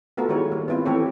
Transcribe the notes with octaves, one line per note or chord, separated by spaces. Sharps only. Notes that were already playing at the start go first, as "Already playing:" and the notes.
A3 B3 F4 F#4 A4 A#4
D#3 G3 G#3 E4 C#5
A#3
B3 C4 E4 F4
E3 A3 C4 G4 A4 C#5